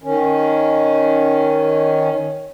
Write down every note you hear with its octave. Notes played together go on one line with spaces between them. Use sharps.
D#3 C#4